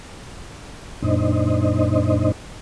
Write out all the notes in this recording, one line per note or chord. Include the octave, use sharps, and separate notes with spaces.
F#2 A#2 D4 D#4 C5 D#5